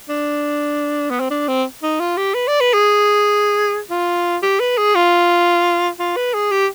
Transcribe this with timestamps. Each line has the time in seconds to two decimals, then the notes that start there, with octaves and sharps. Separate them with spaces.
0.09 D4
1.10 B3
1.20 C4
1.31 D4
1.48 C4
1.83 D#4
2.00 F4
2.17 G4
2.34 B4
2.48 D5
2.60 B4
2.73 G#4
3.90 F4
4.42 G4
4.60 B4
4.78 G#4
4.95 F4
5.99 F4
6.16 B4
6.34 G#4
6.51 G4